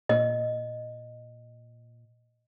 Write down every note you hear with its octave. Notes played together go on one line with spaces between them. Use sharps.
A#2 D#5